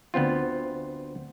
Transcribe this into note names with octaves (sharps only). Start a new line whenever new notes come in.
D2 B3 C4 F4